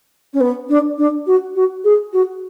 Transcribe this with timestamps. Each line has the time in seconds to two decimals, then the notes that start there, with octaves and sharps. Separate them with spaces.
0.33 C#4
0.41 B3
0.69 D4
0.98 D4
1.27 F#4
1.55 F#4
1.84 G#4
2.13 F#4